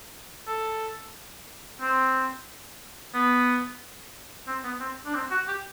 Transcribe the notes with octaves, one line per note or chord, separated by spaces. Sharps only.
A4
C4
B3
C4
B3
C4
D4
C4
F#4
G4